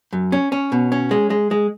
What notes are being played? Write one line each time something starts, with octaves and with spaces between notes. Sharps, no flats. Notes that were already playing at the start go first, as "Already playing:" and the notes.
F#2
C#4
C#4
B2
C#4
G#3
G#3
G#3